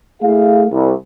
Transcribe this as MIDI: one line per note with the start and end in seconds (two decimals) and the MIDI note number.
0.22 0.64 57
0.22 0.64 64
0.22 0.64 68
0.22 0.64 77
0.71 0.92 36